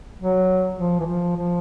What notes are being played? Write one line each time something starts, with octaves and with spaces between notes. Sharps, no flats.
F#3
F3
E3
F3
F3